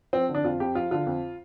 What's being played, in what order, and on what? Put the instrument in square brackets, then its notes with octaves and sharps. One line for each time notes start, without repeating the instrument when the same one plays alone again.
[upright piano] F3 C4
D3
D4
F2 F4
F2 G4
F3 F4
D3 F4
F2